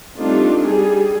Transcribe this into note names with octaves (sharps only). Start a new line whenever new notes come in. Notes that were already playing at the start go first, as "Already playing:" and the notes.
G3 A3 C4 D4 D#4 F4
G3 G#4